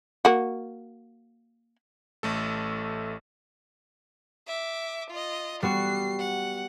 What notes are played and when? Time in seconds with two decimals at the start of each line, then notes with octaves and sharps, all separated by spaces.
0.25 A#3 F#4
2.23 A1 A3 A4
4.47 E5 D6
5.10 F4 D#5
5.63 G3 B3 F#4 C7
6.19 F#5